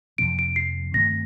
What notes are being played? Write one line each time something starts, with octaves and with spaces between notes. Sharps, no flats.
F2 C3 F3 A#3 D7
D7
C7
G2 D#3 A3 C4 A#6